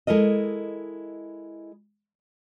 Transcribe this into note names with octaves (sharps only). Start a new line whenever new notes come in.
G#3 E4 A4 A#4 D#5